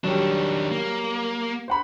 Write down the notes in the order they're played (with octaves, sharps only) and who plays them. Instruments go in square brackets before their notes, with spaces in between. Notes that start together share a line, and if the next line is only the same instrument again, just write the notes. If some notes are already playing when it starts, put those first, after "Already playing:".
[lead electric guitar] D#3 D4 [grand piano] F#3 G3
[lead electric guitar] A#3
[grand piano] C5 F#5 B5